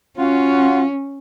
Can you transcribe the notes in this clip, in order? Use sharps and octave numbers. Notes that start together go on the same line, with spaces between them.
C#4 F4 F#4